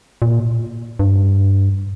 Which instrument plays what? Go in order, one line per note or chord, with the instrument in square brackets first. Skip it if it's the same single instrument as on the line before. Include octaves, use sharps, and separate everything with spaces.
[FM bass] A#2
G2